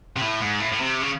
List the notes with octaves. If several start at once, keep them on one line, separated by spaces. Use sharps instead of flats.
C3
A2
G#2
A2
A2
C3
C#3